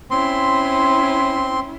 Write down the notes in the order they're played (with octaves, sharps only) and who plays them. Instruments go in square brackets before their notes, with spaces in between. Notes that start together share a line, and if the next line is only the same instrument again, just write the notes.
[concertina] C4 C6 [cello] C#4 E4